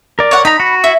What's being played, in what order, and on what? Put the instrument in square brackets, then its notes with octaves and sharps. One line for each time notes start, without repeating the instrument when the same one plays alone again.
[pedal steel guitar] A#4 D5
[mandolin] C#5 F#5
[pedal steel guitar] D#4 A#5 [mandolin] B5
[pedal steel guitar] F#4
[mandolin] E4